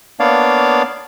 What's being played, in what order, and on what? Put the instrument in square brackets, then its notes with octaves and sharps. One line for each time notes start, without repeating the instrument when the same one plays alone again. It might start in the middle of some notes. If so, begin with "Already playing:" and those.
[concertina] A#3 B3 D4 C#5 D5 F5